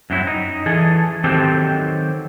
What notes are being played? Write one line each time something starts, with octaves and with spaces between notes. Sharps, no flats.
F#2 F#3 C4 E4
D#4
E3 G#4 A4
D#3 F#3 C4 G4 A4 C5